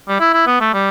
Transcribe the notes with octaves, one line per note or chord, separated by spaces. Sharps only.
G3
E4
E4
B3
A3
G3